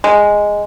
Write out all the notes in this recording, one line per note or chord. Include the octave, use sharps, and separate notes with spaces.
G#3